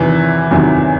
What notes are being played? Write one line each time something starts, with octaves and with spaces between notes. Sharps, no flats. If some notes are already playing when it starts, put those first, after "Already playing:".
Already playing: E2 C3 D#3 E3 F#3
E2 C3 D#3 F#3